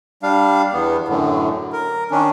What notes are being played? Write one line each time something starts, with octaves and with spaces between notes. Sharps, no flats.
G3 D4 F5
E2 B3
F#2 A2 D3
A#4
D#3 C#4 D4